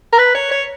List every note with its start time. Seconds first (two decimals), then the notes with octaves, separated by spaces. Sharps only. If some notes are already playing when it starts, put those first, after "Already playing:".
0.13 A#4
0.18 B4
0.35 C#5
0.51 C#5